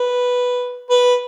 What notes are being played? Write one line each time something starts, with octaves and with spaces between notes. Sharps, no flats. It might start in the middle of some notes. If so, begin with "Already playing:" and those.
Already playing: B4
B4